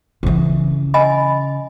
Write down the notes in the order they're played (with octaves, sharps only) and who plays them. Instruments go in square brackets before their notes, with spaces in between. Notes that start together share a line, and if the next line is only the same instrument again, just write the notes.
[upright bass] C#3 E3
[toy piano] D#5 G#5 B5